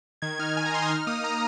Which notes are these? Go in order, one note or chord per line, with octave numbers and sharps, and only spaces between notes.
D#3 G#6
D#4 F6
D#3 G#5
A#5
D#3 C6
D#6
D#4 F6
A#3 D#6
D#4 A#5